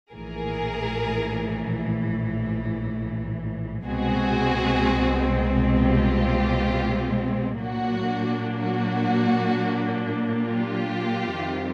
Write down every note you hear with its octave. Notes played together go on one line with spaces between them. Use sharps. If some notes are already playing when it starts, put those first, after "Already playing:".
A#1 A2 E3 G#4 A#4
C2 B2 G#3 C4 F#4 G#4
F4 G4
A#2 F#3 A#3 D4 F#4
F#4
F4 G4
F2 C3 D#3 G3